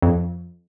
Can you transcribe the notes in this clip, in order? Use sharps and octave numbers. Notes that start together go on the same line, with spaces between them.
F2